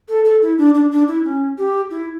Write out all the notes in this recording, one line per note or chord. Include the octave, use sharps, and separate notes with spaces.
A4
A4
E4
D4
D4
D4
E4
C#4
G4
E4